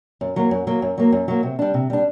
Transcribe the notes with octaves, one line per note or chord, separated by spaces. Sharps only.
F#2
F#3 A#3
F#2
F#3 A#3
F#2
F#3 A#3
F#2
F#3 A#3
C3
G3 D4
C3
G3 D4